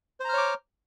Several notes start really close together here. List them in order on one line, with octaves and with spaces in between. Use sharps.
C5 A#5 F6 C#5 D6